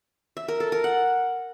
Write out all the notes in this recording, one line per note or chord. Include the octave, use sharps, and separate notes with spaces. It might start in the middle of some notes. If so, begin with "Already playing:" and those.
E5
A#4
A4
A#4
F#5